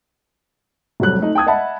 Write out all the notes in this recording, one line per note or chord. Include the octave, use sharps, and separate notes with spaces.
F1 F#3 G3 F#6
A3 D#4
G5 A5 D#6 G#6
D#5 E5 F#5 A5 B5